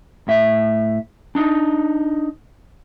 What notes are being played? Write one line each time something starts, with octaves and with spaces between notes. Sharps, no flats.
A2 E5
D4 D#4